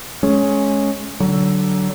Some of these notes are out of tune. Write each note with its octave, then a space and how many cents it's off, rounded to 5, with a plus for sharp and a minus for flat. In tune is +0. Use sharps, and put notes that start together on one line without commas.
G#3 +25 C#4 +0
D3 +0 F#3 +25